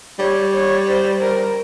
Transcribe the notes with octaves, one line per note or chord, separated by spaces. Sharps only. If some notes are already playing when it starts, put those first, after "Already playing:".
G3 C#5
C#5
C5
A#4